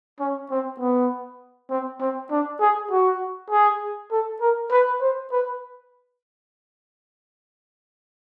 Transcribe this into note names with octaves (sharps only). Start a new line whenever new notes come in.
C#4
C4
B3
C4
C4
D4
G#4
F#4
G#4
A4
A#4
B4
C5
B4